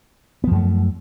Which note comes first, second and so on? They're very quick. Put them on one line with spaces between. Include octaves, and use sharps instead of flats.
B3 F3 F#2 A3